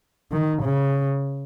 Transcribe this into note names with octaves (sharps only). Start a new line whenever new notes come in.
D#3
C#3